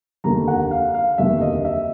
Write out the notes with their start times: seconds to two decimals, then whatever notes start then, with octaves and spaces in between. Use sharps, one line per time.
0.24 F1 D#2 D3 A#5
0.48 F#5
0.71 F5
0.94 F5
1.18 F1 D#2 D3 E5
1.41 D#5
1.65 E5